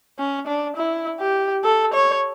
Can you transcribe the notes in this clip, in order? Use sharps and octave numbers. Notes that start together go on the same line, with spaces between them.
C#4
D4
E4
G4
A4
C#5